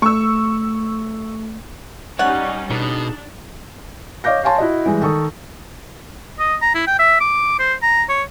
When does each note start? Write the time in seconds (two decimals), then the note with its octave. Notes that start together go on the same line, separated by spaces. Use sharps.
0.02 A3 C#6 E6
2.19 G3 C#4 D#4 C#5 D5 F#5 C#6
2.70 B2 D4 D#4 G#4 A4
4.24 C#5 D#5 F5 D6 G6 A#6
4.44 C#5 F5 G#5 A5 C6
4.58 E4 F#4 D#5
4.86 E3 G3 G#3
5.02 D#3 A4 C#6 D#6
6.39 D#5
6.61 A#5
6.74 E4
6.87 G5
6.99 E5
7.20 D6
7.59 C5
7.82 A#5
8.09 C#5